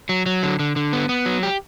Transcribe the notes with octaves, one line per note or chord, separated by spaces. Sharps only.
F#3
F#3
D3
D3
D3
B3
B3
F#3
G4